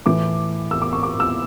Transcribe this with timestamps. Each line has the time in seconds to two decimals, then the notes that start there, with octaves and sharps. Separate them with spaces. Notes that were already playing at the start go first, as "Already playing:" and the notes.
0.06 A2 E3 A3 D6
0.71 E6
0.82 D6
0.93 C#6
1.03 D6
1.20 E6